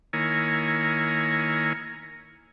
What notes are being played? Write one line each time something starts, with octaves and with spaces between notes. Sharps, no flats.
D#3 A#3 E4 A#4 C#5 G#5